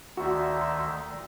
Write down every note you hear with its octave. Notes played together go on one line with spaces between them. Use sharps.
D2 D#3 F#4 D5 E5 A#5 C6